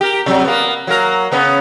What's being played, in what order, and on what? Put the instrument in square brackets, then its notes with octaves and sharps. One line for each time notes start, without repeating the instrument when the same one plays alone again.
[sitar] G4 A#4
C3 F#3 G3
A#3 B3
F#3 A#3 A#4
C#3 B3 C#4